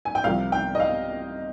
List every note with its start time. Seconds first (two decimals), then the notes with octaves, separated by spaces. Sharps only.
0.05 G#5
0.15 G5
0.24 C2 C3 F3 F5
0.52 G5
0.75 D#5
0.80 F5